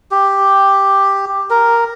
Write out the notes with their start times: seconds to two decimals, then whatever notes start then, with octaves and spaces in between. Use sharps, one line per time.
0.11 G4
1.50 A#4